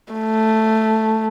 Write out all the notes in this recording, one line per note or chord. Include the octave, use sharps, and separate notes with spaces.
A3